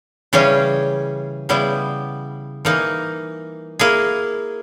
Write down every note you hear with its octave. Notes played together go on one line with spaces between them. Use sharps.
C#3 E3 G3 C#4 G#4
C#3 G3 B3 E4
E3 A#3 D#4
A#3 E4 G#4